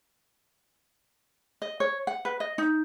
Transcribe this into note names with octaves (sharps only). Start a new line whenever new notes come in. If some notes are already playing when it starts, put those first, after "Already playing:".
D#5
C#5
F#5
B4
D#5
D#4